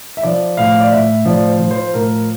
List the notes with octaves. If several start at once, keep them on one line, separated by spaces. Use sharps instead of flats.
E5
F3 D5
A2 F5
D5
A2 E5
F3 D5
C5
F3
C5
A2 A#4